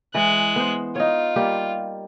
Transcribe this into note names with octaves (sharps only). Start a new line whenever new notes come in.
E3 G#3 F#6
B3 C5
D#4 F4 C#5
G3 A#3 G4